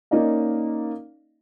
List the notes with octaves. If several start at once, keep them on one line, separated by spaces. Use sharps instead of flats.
A#3 C#4 D#4 D5 D#5 F5